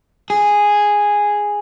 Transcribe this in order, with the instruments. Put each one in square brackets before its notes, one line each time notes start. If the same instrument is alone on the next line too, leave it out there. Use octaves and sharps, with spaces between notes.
[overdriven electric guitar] G#4